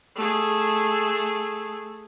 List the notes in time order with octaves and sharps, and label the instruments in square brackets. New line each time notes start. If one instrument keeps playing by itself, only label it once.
[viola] A3 G#4